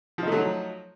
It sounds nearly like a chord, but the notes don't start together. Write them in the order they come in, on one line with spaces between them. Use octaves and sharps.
F3 D#4 A3 F#3